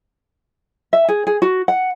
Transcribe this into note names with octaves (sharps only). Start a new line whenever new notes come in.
E5
G#4
G#4
F#4
F#5